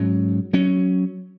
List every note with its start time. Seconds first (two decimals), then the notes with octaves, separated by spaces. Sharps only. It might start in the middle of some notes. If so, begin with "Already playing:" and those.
Already playing: G#2 F#3 C#4
0.53 F#3 C#4